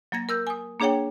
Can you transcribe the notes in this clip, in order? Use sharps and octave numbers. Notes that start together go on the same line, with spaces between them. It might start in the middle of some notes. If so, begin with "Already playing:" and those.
F#3 A#3 G#6 A#6
A#4 E6 G6
G#5 D#6
A#3 D4 G#4 C#5 F#5 G5